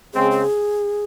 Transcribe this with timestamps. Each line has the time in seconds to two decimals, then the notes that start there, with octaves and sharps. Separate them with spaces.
0.14 C#3 G#3 C4 G#4
0.31 G#4